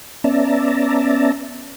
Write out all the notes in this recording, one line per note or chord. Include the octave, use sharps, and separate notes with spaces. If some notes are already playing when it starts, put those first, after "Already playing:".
B3 C#4 D5 E5 A5 A#5